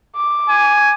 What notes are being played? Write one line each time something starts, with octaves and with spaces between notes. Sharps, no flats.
D6
G#5